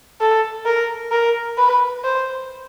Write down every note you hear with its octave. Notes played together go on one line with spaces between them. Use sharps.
A4
A#4
A#4
B4
C5